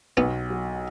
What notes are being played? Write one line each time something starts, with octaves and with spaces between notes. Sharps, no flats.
B1 B3
F#3